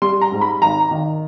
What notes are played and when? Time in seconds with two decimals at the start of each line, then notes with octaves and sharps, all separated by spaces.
0.02 G3 C6
0.21 A#5
0.32 G#2
0.41 B5
0.62 G#1 A#5
0.91 D#3